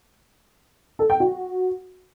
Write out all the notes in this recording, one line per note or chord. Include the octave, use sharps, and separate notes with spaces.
A4
G5
F#4